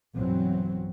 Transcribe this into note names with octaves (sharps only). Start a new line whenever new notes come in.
B1 G2 E3 F#3 C4